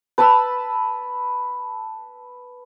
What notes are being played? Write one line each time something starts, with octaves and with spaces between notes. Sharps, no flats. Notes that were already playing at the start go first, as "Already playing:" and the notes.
B4 A5 B5 E6